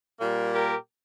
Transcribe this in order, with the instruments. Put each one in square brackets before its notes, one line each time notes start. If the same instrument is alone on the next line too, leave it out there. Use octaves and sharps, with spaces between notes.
[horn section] A#2 G3 A#3
G4 A#4